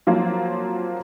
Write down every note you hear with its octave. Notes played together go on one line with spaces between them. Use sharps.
F3 F#3 A#3 C4 F4